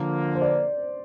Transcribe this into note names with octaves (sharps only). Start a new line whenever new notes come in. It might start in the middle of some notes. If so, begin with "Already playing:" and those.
Already playing: D3 F3 A#3
C5
D5